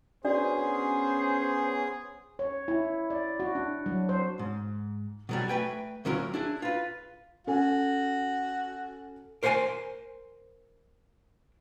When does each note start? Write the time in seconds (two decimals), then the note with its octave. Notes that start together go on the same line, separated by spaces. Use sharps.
0.25 B3 C#4 D4 F#4 G#4 C5 D5
2.39 C#5
2.68 E4
3.10 D5
3.40 F#4
3.55 D4
3.86 F#3
4.09 C5
4.39 G#2
5.29 B2 F#3 G3
5.48 A3 B4 G5 G#5
6.05 D2 A#2 F#3 C#4 E4 A#4
6.34 D4 E4 G#4
6.62 F4 B4
7.47 C#4 F#4 A4 G#5
9.43 A#4 C5 C#5 F#5 G#5 C6